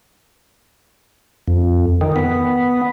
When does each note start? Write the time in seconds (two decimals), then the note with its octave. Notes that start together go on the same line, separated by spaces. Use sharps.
1.47 F2
2.01 D#3
2.16 B3